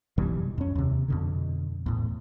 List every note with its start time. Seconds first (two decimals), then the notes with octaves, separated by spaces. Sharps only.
0.18 F#2 B2 E3 G3
0.58 F2 C#4
0.76 D#2 C3
1.08 F2 B2 D3
1.86 E2 A2